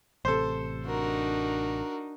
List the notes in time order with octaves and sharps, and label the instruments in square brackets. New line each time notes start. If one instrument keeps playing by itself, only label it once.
[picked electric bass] A1 C3 [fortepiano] A4 C5
[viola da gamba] D4 D#4 [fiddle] F#4 A#4